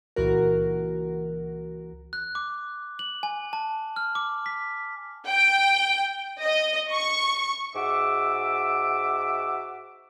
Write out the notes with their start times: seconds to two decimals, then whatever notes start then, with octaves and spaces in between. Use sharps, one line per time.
0.16 C#2 A#2 E3 F#4 A#4
2.13 F#6
2.35 D6
2.99 F#7
3.23 G#5
3.53 A5
3.96 F6
4.15 D6
4.46 B6
5.27 G5
6.41 D#5
6.91 C#6
7.75 G#2 F#4 E5 D6